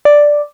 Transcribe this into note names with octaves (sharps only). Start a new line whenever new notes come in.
D5